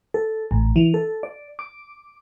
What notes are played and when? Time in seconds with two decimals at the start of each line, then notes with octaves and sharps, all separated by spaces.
0.14 A4
0.51 A1
0.76 E3
0.94 A4
1.23 D5
1.59 D6